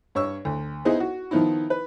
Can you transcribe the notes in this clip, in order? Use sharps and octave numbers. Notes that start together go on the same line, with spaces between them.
G2 C#5 C#6 E6
D2
B3 D#4 E4 G#4 C5 D#5
F#4
D#3 F3 B3 D#4 E4
B4